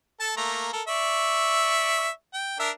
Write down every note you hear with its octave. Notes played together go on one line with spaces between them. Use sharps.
A4 A5
A3 A#3 A#5
A4 A#4
D5 E5 C#6
G5
D4 A#4 E5